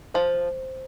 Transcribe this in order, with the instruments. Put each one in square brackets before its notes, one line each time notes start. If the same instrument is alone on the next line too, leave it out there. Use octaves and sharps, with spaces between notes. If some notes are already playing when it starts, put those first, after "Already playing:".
[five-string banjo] F3 [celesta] C5